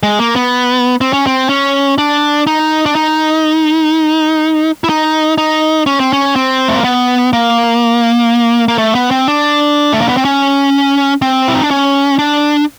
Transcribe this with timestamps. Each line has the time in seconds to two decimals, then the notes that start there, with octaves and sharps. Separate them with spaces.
0.03 G#3
0.19 A#3
0.36 B3
1.01 C4
1.13 C#4
1.26 C4
1.49 C#4
1.98 D4
2.47 D#4
2.86 D4
2.95 D#4
4.84 E4
4.89 D#4
5.38 D#4
5.86 C#4
6.00 C4
6.13 C#4
6.36 C4
6.68 A3
6.76 A#3
6.84 B3
7.33 A#3
8.68 A#3
8.78 A3
8.95 B3
9.11 C4
9.28 D4
9.93 A3
10.01 A#3
10.09 B3
10.17 C4
10.25 C#4
11.22 C4
11.48 E4
11.55 D#4
11.63 D4
11.71 C#4
12.19 D4